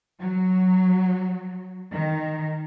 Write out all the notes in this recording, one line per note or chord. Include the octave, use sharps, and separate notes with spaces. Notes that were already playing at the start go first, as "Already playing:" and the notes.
F#3
D#3